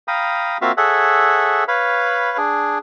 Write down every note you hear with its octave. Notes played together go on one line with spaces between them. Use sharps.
F5 G5 A#5 B5 D#6
A#3 C4 F4 F#4 E5 F5
G#4 A4 C#5 E5 F#5
B4 C#5 F5 B5
D4 G#4